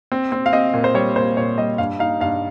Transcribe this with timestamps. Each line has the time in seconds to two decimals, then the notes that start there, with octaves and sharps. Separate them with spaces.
0.12 C4
0.32 C4
0.46 F5
0.53 C4 D#5
0.74 A#2
0.84 C5
0.94 G3 C#5
1.16 A#2 C5
1.37 A#2 C#5
1.58 G3 D#5
1.78 G2 F5
1.99 D#4 F5
2.20 G2 F5